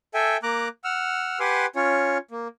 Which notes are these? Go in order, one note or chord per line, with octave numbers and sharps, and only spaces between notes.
A4 E5 G5 G#5
A#3 A#5 D6 F#6
F#5 E6 F6
G4 B4 F#5 G#5 C6 D6
C#4 F4 C#5
A#3